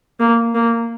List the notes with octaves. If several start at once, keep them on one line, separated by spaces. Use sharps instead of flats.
A#3
A#3